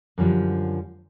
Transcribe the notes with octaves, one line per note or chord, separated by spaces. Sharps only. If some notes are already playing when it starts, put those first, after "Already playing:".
F#2 D3 F3 G3